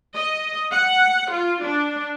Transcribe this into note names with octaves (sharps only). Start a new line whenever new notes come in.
D#5
F#5
F4
D4